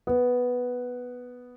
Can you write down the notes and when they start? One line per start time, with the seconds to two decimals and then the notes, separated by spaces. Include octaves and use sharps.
0.07 B3